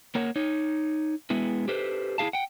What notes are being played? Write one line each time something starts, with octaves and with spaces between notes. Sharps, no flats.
A#3 A#4 C#5 F#5
D#4 C#5
G#3 B3 E4
G4 A4 B4 C5
E4 F#4 G#4 F5 A5
F#5 G5